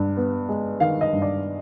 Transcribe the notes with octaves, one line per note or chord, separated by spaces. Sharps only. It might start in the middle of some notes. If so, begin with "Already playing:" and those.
Already playing: G2
B3
G#3
D#3 F5
D#5
G2
D5